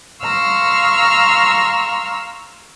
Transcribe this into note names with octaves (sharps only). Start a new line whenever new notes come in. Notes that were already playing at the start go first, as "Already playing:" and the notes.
F5 A#5 C6 C#6 E6 F6